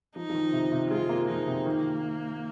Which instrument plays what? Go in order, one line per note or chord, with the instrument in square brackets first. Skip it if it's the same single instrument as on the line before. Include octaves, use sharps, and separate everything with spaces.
[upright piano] F3 [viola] D#4
[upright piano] F3
D#3
C3
C3
[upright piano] G#3 [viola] F4
[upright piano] A#3
[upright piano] F3 [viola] D#4
[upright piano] C3
[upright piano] D#3 [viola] A#3